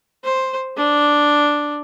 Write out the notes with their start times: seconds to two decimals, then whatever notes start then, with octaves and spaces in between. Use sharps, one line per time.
0.24 C5
0.77 D4